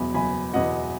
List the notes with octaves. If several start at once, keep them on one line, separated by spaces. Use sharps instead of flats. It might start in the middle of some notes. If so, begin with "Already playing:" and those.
Already playing: F#1 E2 B2 G#5 B5
F#1 G#5 B5
E2 B2 D#5 F#5